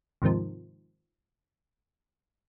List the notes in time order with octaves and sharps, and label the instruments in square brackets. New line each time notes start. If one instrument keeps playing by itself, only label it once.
[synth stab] D#2 G#2 C3 D#3 F3